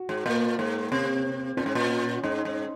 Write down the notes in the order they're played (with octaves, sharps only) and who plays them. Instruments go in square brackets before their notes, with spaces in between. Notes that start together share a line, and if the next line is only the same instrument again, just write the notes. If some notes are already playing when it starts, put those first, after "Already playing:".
Already playing: [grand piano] F#4
[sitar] G#2
[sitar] A#2 [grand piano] A#3
[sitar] G#2
[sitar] C3 [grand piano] C4
[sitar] A#2 [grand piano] C#4
[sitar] G#2
A#2
[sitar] G#2 [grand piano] D#4
[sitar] G#2